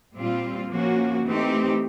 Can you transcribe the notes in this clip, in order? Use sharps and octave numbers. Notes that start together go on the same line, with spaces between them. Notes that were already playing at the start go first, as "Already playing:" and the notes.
A#2 G3 C4 F4
F3 A#3 C#4 F#4
E3 A3 C4 D#4 G4